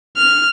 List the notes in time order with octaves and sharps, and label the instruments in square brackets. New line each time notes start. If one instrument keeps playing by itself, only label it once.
[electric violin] F6